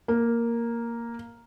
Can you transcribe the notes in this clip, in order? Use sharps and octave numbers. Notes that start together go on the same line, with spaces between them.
A#3